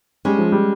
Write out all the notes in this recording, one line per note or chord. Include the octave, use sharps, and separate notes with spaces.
G3 G#3 C#4 G#4
F3
G3